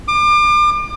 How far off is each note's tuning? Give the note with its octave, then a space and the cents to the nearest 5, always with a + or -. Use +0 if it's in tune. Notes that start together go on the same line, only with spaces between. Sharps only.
D6 +35